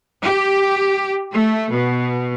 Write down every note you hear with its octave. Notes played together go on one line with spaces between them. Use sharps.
G4
A3
B2